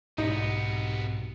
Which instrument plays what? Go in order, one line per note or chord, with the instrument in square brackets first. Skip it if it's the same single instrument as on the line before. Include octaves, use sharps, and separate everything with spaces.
[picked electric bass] B1 [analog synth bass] G#2 [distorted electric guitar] C3 B3 [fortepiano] D#4